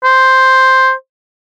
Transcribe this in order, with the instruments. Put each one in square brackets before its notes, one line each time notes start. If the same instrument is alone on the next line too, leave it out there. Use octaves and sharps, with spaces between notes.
[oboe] C5